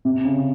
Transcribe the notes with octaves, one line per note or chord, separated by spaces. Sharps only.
C3
C#3